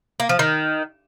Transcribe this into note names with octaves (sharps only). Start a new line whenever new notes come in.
A#3
F3
D#3